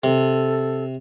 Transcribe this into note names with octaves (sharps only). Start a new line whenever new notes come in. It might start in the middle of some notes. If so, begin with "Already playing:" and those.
C3 A4